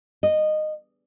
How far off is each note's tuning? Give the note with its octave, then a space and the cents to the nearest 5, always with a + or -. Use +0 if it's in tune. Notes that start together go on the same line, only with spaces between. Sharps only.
D#5 -15